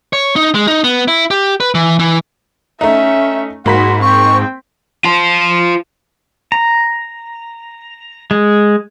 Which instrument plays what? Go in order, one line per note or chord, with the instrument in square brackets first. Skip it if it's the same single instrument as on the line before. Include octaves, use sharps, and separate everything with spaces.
[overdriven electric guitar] C#5
D#4
G#3
D#4
B3
E4
G4
B4
E3
E3
[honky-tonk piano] A3 D#4 [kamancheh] C#4 E5
[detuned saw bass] G#2 [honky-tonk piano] A#3 B5 B6 [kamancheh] F#4 [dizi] C6
[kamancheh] C4 G5 [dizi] C#6
[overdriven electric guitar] F4 C5
[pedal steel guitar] A#5
G#3